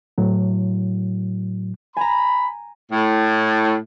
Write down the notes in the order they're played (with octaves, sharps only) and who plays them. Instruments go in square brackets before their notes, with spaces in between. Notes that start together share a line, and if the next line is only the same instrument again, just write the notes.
[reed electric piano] A2 F#3
[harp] G#5 A#5 [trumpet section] B5
[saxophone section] A2